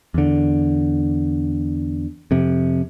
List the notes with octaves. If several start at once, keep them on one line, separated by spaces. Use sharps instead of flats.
E2 D3
F2 C3